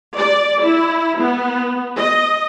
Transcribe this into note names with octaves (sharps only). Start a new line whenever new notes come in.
D5
E4
B3
D#5